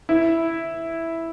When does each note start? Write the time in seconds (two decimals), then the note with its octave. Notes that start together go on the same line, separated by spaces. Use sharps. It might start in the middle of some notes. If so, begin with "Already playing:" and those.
0.09 E4